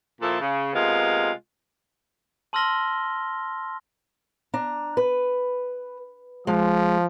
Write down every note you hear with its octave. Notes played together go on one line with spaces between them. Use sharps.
A#2 F3 E4 A4
C#3
C3 G#3 A#3 B3 F4
A5 C6 E6 F6 A#6 G7
D4 A#5
B4
F3 G#3